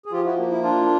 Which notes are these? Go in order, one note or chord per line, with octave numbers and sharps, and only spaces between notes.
G#4
F3 F4 G4
E4 F#4
A#3
E4
D4 F4